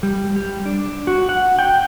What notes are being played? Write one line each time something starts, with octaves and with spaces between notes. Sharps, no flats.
G3
G3
D4
F#4
F#5
G5